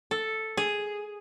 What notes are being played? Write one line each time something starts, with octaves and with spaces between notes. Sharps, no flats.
A4
G#4